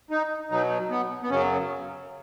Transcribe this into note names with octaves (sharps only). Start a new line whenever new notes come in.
D#4
B2 F#3 D#4
B3
B3
F#2 C#3 F#3 C#4